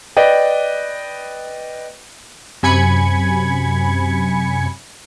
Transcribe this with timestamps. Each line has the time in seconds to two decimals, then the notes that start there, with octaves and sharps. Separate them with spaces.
0.17 B4 D5 D#5 G5
2.63 F#2 C3 G#5 B5 G#6 C#7